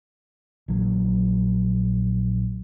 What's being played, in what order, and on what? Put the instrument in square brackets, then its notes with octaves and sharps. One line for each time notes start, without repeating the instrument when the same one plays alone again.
[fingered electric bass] A#1 F#3